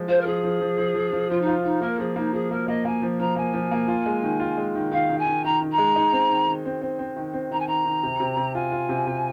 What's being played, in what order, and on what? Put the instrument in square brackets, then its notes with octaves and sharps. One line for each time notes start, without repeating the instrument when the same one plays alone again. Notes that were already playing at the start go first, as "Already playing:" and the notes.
Already playing: [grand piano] F3 G#3
[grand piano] F4 [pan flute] C5
[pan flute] A#4
[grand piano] F3 [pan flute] G#4
[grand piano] F3
F3
F3
F3
F3
[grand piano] F3 [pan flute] F4
[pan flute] D#4
[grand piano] F4
[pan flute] D#4 [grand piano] F4
[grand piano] A#3 [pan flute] A#4
[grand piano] F3 [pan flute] G#4
[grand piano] A#3 [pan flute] D#4
[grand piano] F3 [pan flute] G#4
[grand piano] A#3 [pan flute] A#4
[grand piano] A#3 [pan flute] D#5
[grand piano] A#3 [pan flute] G#5
[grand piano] F3
[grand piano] F3 [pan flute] A#5
[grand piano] A#3 [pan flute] G#5
[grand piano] F3
A#3
F4
G#3
D#3
F4
G#3
D#3
[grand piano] D#3 [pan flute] F5
[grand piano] D#3
[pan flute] G#5
[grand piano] D#3
[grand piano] D#3 [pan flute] A#5
[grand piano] D#3
[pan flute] A#5
[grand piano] G#3
D#4
C4
D#3
D#3
C4
C4
C4
D#3
C4
[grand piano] D#3 [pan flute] A#5
[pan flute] G#5
[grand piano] D#3 [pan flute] A#5
[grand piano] D#3
C3
C3
C3
[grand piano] F4 [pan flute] G#5
[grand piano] F4
C3
C3